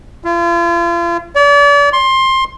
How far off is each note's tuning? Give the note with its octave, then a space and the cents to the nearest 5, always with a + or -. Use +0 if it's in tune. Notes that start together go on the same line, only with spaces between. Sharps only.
F4 -40
D5 -40
C6 +20